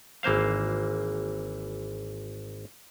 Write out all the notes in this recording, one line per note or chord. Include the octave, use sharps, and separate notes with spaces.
G#1 E3 A#3 C5 F5